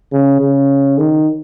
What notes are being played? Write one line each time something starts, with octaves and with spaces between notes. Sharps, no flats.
C#3
C#3
D#3